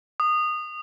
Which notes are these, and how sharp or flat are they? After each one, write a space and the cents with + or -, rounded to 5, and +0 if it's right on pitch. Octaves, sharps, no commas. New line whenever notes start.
D#6 -20